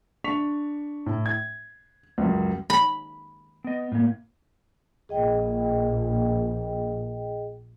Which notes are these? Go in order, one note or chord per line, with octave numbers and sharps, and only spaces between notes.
D4 C#6 B6 F7
A2
G#6
C#2 F#2
B5
B3 D#5
A2 A#3
A#1 G#4 D#5 G5